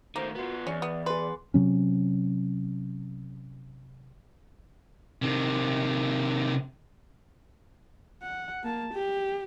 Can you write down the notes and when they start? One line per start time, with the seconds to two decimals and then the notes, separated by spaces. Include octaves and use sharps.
0.16 D#3 A3 A#3 C5
0.35 B3 F4 F#4
0.67 E2 C#4 D5
0.82 B3
1.06 G#4 B4 C6
1.54 C3 F#3 C#4
5.22 C3 D#3
8.22 F#5
8.63 A#3 A5
8.94 G4